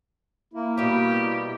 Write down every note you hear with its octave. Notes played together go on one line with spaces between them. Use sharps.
A#3 E4
B2 G3 G4